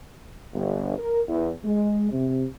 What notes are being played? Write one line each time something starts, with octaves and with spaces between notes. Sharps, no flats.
G1
A#4
E2
G#3
C3